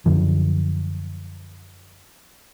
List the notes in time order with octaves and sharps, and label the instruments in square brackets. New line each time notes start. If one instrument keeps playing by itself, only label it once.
[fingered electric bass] F#2 D3 F3